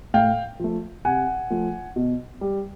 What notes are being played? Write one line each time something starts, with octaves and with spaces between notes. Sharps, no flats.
A2 F5 G5
F3 A3
C3 F#5 G#5
F3 A3
B2
G3